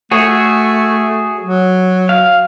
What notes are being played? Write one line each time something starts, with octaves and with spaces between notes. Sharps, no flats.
A3 F#4 G#4 C#5
F#3
F5